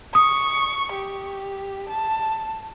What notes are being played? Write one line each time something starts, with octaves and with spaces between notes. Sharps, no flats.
C#6 D#6
G4
A5